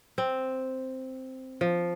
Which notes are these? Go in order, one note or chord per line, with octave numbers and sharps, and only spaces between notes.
C4
F3